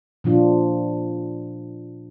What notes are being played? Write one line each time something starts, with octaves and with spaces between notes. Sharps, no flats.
A#2 F3 D4 F4